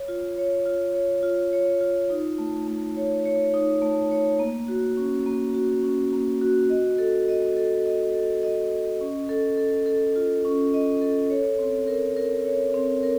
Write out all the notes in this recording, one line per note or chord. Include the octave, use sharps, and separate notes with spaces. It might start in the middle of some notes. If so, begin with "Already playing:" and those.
Already playing: C#5
F4
C#5
F4
C#5
F4
C#5
F4
D#4
A3
A3
C#5
C#5
D#4
A3
C#5
A#3
F#4
C#4
A#3
F#4
C#4
A#3
F#4
D#5
A4
D#5
A4
D#5
A4
D#5
D#5
C#4
A4
A4
A4
F4
C#4
D#5
A4
C#5
C4
A#4
A#4
C#5
C4
A#4